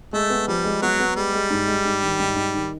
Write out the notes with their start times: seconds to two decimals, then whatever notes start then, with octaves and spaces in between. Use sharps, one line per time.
0.13 G#3 A3
0.30 B3
0.48 F3 G3
0.65 G#3
0.82 F#3 B3
0.99 B3
1.16 G3 G#3
1.33 G#3
1.50 G#2
1.67 G#3
1.85 G#2
2.02 D#3
2.19 G#2
2.36 G#2
2.54 D#3